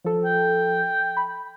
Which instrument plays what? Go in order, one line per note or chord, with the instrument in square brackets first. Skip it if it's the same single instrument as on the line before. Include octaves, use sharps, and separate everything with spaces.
[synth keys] F3 A4
[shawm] G5
[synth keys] B5